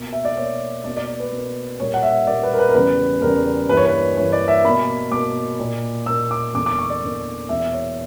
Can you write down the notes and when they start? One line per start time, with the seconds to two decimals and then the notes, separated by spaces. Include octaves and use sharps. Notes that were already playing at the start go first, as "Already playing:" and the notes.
Already playing: B2 A#3
0.13 E5
0.25 D5
0.37 B2 A#3 C#5
0.84 B2 A#3 D5
0.97 D5
1.08 D5
1.20 B4
1.31 B2 A#3
1.79 A#2 G3 A#3 C#5
1.94 F#5
2.03 E5
2.26 A#2 G3 A#3 D5
2.43 B4
2.53 A#4
2.59 B4
2.69 A#4
2.74 E2 C#3 G3 B4
3.21 E2 C#3 G3 A#4
3.69 G2 E3 A#3 B4
3.77 C#5
3.85 B4
4.16 G2 E3 A#3 C#5
4.33 D5
4.48 E5
4.64 B2 A#3 B5
5.12 B2 A#3 D6
5.60 A#2 A#3
6.06 A#2 A#3 E6
6.31 D6
6.54 E2 D3 A#3 D6
6.66 D6
6.79 C#6
6.90 D5
7.02 E2 D3 A#3
7.49 E2 B2 A#3 E5
7.73 C#5